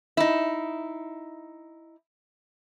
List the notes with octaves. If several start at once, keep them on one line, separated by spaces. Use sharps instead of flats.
D#4 E4